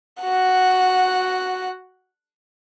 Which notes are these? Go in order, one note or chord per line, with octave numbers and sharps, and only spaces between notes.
F#4 F#5